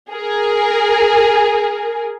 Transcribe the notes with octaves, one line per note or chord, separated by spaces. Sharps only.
G#4 A#4